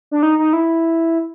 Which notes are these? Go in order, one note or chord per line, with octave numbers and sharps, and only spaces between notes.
D4
D#4
D#4
E4